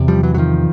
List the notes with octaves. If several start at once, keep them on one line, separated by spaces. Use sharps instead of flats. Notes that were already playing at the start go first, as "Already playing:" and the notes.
Already playing: E2 C3
F3 G3
E3 F#3
F#3
D#3 F3